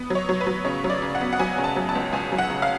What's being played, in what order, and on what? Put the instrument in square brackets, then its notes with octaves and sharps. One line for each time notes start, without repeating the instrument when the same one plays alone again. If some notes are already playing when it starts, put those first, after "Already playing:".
Already playing: [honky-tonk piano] B3
F#3 C#5
F#3
B4
F#3
C#3 C#5
F#3
D5
C#3
F#5
B3
F#5
F#3 G#5
C#3
A5
F#3
A5
C#2
C#2 G#5
F#3
F#5
C#3
F5